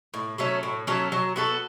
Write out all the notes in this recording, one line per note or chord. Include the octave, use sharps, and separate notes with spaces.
A2
F#3 A3 C#4
A2
F#3 A3 C#4
F#3
B3 F#4 A4